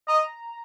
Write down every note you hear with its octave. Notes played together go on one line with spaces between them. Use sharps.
D#5 A#5